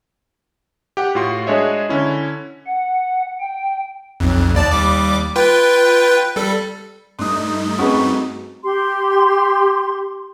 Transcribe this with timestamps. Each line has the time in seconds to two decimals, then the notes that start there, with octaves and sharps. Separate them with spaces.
0.97 G4 F#5 G5
1.15 A2 F4 F#4 C6
1.47 G#3 D4 G#4 C#5 D#5 E5
1.89 D3 C#4 E4
2.66 F#5
3.40 G5
4.20 B1 F2
4.55 D#2 D5 A5
4.71 D#2 G3 D6
5.36 F4 B4 G5
6.36 G3 A4
7.19 G2 A3 D4 D#4 C6 D#6
7.78 C4 C#4 F#4 G#4 B4 C#6
8.63 G4 C6